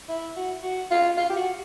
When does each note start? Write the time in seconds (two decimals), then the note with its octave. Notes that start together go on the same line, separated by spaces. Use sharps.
0.09 E4
0.37 F#4
0.63 F#4
0.91 F4
1.18 F4
1.30 G4
1.37 F#4